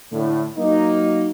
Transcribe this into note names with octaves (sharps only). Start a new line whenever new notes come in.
A2 D3
F#3 A#3 D#4